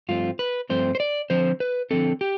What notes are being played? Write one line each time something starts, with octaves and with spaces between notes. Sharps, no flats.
G2 F3 A3 C4 F4
B4
G2 F3 A3 C4 C5
C5
D5
D3 F3 C4 C5
B4
D3 F3 C4 A4
G4